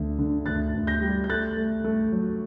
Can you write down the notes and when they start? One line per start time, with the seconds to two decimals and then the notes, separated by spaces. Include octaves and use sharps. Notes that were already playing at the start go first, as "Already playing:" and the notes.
Already playing: D2 D3
0.19 D3
0.46 D2 F#6 A6
0.74 D2
0.87 G6 A#6
1.01 G3
1.24 G6
1.29 A3 F#6 A6
1.57 A3
1.84 A3
2.12 F#3